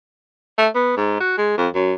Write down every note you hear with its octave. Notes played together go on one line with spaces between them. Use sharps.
A3
B3
G#2
F#4
G#3
F2
F#2